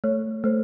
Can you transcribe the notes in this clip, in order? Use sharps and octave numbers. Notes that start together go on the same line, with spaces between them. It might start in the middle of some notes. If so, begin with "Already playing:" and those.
A3 C#5
A3 C5